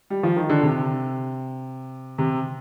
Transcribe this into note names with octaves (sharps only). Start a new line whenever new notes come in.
G3
F3
D#3
D3
C3
C3